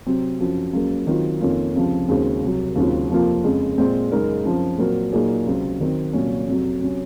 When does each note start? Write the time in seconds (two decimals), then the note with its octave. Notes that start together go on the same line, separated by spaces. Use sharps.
0.06 C3 F#3 C4
0.40 F#2 F3 C4 F#4
0.73 C#2 C#3 F#3 A#3
1.07 D#3 F#3 C4 F4
1.41 F2 D#3 A#3 C#4 F4
1.75 C#2 C3 F3
2.08 D#2 C#3 G#3 C4 F#4
2.42 C2 C3 F#3
2.76 D#2 C#3 F#3 C4 F4
3.10 F2 C3 F3 A#3 F4
3.44 F2 C#3 G#3
3.78 A#2 G#3 C4
4.12 F#2 C#3 G#3 D#4 A#4
4.44 F#2 F3 C4
4.78 A#2 F#3 C4 F#4 A#4
5.12 A#2 F#3 A#3 D#4 G#4
5.46 C#2 C3 F#3 C4
5.81 D#3 F#3 C4
6.13 C2 A#2 F#3 C#4
6.47 F2 C3 F#3
6.82 C3 F#3 C#4